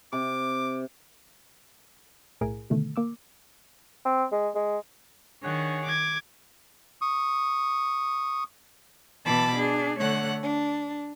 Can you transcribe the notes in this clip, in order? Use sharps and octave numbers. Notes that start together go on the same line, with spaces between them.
C3 D6
B1 A2 E4 G#4 A#4 D7
B2 D3 D#3 A3
A#3 D6 E6
C4
G#3
G#3
D#3 D4 G#4 C#5 F#5
D6 G#6
C#6 D#6
B2 E3 A5 B5 D6
D4 G#4
D3 A3 C#5 F#5 F#6
D4